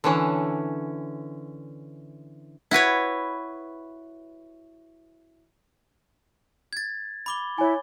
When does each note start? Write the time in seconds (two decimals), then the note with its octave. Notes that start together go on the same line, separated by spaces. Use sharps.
0.04 D3 E3 C#4
2.71 E4 F#4 B4 C#5
6.73 G#6 A6
7.26 B5 D6 G7
7.58 E4 C#5 G#5